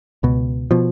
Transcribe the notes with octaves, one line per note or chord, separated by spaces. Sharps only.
C#2 B2
B2 F3